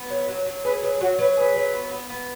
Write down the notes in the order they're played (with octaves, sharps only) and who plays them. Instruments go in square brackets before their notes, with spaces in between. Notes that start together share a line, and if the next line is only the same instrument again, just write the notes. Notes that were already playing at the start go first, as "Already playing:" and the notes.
Already playing: [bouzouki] B3
F#3
F#3
F#3
[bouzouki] G#4 [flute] B4
[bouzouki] F#3 [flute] B4
[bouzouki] F#3 [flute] F#4
[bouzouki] F#3 [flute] B4
[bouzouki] G#4 [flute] B4
[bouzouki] F#3
B3
B3
B3